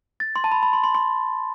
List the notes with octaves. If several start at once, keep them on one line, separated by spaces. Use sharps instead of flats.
A6
C6
A5
B5
B5
C6
C6
C6